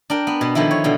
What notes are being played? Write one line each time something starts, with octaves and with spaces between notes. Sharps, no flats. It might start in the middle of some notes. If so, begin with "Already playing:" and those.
D4 A#4 G5
B3
B2
D3 D#3 F3 B3 E4
C#5
B2 D3